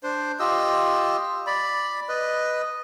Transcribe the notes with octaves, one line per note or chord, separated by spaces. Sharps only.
D4 C5
F4 G4 D#5 E6
D5 B5
B4 D#5